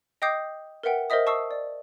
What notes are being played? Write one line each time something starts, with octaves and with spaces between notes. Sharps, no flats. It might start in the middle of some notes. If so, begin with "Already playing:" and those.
D#5 G5 D6 D#6 G6 C7
A#4 B4 E5 F#5 G5
A#4 C5 D#5 E5 D#6
A5 C#6 D#6 E6 C7
D5